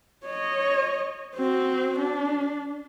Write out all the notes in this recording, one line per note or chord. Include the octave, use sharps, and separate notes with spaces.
C#5 D#5
C4 F#4
D4